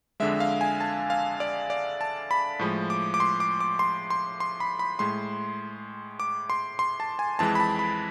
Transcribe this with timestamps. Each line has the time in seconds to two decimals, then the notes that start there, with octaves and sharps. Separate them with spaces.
0.20 F2 D3 G#3 E5
0.40 F5
0.61 G#5
0.80 A5
1.10 F5
1.40 D5
1.70 D5
2.01 A5
2.31 B5
2.59 A2 F3 G#3
2.90 D6
3.14 D6
3.20 C6
3.40 D6
3.61 D6
3.79 C6
4.10 C6
4.40 C6
4.60 B5
4.79 B5
4.99 A2 G#3 C6
6.20 D6
6.50 C6
6.79 C6
7.00 A5
7.19 G#5
7.39 F2 E3 G#3 A5
7.55 B5
7.60 A5
7.79 B5